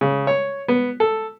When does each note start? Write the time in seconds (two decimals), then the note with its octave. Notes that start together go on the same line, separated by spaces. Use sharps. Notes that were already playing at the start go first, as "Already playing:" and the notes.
0.01 C#3
0.27 C#5
0.68 B3
1.00 A4